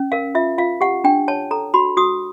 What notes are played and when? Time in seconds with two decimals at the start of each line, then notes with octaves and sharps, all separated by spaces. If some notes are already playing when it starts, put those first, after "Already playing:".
Already playing: C#4
0.12 A#4 F5
0.35 F4 E5
0.58 F4 F5
0.81 G4 F#5
1.04 D4 G5
1.28 C#5 A5
1.51 A4 A#5
1.74 F#4 B5
1.97 F#4 D#6